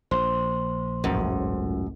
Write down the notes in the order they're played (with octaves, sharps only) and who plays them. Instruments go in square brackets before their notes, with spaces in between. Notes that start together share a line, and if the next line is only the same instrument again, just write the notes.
[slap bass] A#1 [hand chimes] C5 C6
[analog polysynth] G#1 C#2 A2 [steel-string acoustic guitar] F#2